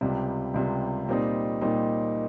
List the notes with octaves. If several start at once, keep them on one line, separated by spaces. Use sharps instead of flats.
C#2 C3 G3
C#2 C3 G3
A#2 G3 C4 D#4
A#2 G3 C4 D#4